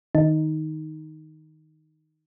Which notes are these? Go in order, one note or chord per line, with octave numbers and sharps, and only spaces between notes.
D#3 D#4